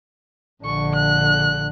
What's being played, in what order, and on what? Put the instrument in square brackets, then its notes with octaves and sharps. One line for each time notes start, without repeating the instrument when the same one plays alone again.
[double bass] A#1 D3 [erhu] C#6
[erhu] F#6